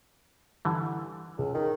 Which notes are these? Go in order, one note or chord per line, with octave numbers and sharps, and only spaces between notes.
D3 E3 G3
C#2
D#3